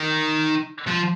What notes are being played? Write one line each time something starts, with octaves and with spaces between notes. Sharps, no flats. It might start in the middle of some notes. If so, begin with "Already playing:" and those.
Already playing: D#3
F3